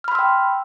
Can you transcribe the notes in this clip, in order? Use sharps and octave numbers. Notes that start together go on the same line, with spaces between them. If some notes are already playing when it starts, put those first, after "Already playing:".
G5 B5 C6 E6 F6